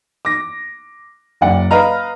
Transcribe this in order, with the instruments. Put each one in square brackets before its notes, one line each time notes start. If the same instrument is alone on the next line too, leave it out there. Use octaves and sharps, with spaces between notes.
[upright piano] D6 A#6
F#1 D5 F#5
B4 D#5 F5 A#5 F6